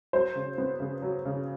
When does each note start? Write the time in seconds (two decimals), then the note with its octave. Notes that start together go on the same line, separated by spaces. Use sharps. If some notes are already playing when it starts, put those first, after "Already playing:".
0.13 F#3 C5
0.35 C#3
0.58 B3
0.80 C#3
1.02 F#3
1.25 C#3